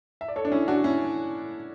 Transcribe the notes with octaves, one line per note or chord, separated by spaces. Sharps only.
E5
D5
A4 C#5
D4
C#4 E4
D4 F#4
C#4 E4